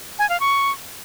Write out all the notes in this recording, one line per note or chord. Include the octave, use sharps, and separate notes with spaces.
G#5
F5
C#6